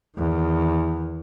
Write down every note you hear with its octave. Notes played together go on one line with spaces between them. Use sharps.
E2 D#3